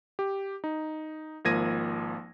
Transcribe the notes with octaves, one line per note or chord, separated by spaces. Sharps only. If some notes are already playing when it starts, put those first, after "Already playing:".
G4
D#4
G#1 F3 A#3 G#6 A#6 D#7